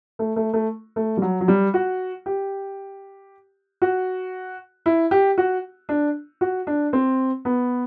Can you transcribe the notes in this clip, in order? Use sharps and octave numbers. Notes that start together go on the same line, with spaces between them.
A3
A3
A3
A3
G3
F#3
F#3
G3
F#4
G4
F#4
E4
G4
F#4
D4
F#4
D4
C4
B3